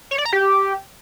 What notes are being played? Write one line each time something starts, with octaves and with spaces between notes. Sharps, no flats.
C#5
D5
A#5
G4